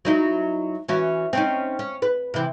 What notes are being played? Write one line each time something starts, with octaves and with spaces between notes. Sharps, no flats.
F#3 D#4 E4
E3 C#4 F#4
C4 C#4 D#4
C#4
B4
C3 E3